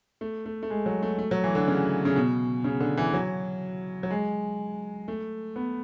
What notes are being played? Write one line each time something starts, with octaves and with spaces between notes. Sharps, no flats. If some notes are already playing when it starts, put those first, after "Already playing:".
A3
A3
A3
G#3
F#3
A3
A3
F#3
E3
D3
C#3
C#3
B2
C#3
D3
E3
F#3
F#3
G#3
A3
B3